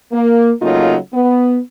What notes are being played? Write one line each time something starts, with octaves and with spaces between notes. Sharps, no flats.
A#3
C#3 F#3 A3 A#3 D#4 F4
B3